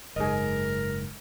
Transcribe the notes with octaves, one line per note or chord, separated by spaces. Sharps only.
F#1 G#2 G#4 A#4 D#5